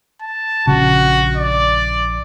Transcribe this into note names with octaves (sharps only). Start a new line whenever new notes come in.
A5
A#1 C#3 F#4
D5